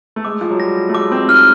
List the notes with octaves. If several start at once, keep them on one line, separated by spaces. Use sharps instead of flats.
A3
G#3 D6
F3
F#3
G3 A#6
A3
G#3 D6
C4
D#4 F6